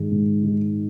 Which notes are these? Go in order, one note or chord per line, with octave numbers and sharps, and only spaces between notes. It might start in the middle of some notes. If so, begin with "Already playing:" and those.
Already playing: G#2 D#3 G#3
G#2
D#3 G#3